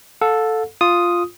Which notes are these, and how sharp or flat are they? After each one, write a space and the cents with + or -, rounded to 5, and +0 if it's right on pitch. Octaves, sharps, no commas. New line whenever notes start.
A4 +0 F5 +45
F4 +0 D#6 +0